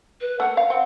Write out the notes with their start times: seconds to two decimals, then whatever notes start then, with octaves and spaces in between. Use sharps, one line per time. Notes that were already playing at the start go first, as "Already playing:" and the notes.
0.21 B4
0.40 A3 A#3 F#5
0.57 F5
0.70 C4